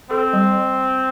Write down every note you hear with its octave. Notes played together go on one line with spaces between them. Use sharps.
C4 A4
G3